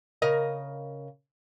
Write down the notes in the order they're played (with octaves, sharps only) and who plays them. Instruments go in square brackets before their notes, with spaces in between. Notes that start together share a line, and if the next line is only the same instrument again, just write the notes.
[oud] C#3 A#4 D#5